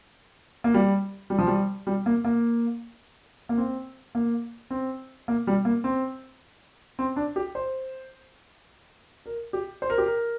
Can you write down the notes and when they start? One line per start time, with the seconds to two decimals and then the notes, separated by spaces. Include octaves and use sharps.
0.64 A#3
0.74 G3
1.30 G3
1.39 F3
1.47 G3
1.87 G3
2.06 A#3
2.25 A#3
3.49 A#3
3.58 C4
4.15 A#3
4.71 C4
5.28 A#3
5.47 G3
5.65 A#3
5.84 C4
6.99 C4
7.16 D4
7.36 G4
7.55 C5
9.26 A#4
9.53 G4
9.82 C5
9.90 A#4
9.98 G4
10.06 A#4